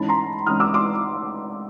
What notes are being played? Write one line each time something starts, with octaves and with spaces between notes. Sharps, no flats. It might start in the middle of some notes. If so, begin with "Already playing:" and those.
Already playing: G#2 E3 G#3 C#4 A5 B5
A#5 C6
G#2 E3 G#3 C#4 D#6 F6
D6 E6
C6 D6